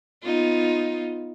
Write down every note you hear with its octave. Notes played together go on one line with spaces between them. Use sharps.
B3 D#4 F4